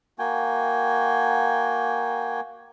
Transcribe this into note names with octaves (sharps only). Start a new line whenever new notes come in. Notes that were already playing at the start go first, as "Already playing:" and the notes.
A#3 F#4 G5 G#5